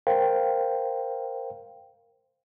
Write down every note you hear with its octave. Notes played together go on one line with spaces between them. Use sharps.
A#4 C5 F5 G5